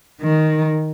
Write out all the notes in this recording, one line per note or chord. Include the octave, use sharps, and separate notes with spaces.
D#3